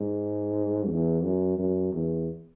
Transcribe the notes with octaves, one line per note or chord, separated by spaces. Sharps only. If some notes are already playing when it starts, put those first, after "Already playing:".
Already playing: G#2
E2
F#2
F#2
E2